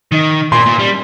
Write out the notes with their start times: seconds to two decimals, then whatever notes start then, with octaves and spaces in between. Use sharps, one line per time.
0.12 D#3
0.52 A#2 C6
0.66 A#2
0.79 G3